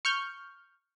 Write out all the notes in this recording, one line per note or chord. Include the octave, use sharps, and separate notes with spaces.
C#6 F6 G6